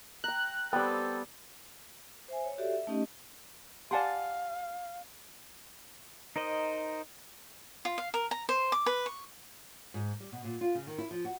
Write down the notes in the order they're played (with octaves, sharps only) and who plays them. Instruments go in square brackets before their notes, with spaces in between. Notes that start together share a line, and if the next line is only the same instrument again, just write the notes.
[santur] G5 A#5 [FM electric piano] F#6
[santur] G3 B3 [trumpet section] C4 G4 A4 [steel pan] G5
[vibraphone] C5 E5 G#5
C#5
F#4 G4 A4 D5 E5
E5
A3 C#4 D#4 G4 D#5
[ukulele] G4 F#5 G#5 [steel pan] D5 A5 C6 [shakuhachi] F5
[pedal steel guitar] D#4 A#4 C5 D#5
[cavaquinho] F4
F5
A#4
A#5
C5
D6
B4
C#6
[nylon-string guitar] G#2
G3
B2
A#2
F4
C#3
D#3
E4
F3
F#4